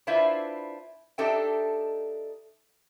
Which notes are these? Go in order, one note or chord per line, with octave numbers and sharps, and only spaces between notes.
D4 E4 F4 B4 C5 E5
D4 D#4 G4 A4 E5 G5